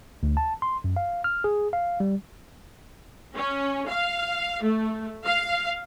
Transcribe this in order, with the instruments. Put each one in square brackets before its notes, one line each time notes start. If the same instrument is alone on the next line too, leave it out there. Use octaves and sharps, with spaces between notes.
[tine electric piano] D2
A5
C6
F#2
F5
F6
G#4
F5
G3
[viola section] C#4
F5
A3
F5